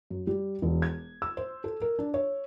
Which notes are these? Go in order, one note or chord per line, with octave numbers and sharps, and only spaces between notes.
F#2
G3
E1
G#6
E6
C5
A4
A#4
D4
C#5